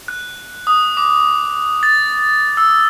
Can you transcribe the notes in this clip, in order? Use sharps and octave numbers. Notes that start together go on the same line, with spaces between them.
F#6
D#6
D6
A6
E6